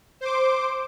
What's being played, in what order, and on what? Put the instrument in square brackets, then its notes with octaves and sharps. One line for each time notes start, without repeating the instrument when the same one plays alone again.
[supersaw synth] C5 D6